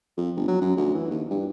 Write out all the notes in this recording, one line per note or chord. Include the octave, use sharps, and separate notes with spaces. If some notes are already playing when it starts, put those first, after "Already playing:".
F2
G1
F#3
F#2
D2
E3
D#2
G2